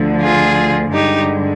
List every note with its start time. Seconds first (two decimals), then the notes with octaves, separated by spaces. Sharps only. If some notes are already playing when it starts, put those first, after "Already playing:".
Already playing: D2 D3 F3
0.20 F4 G#4
0.92 G2 D3 G#3 D#4 G4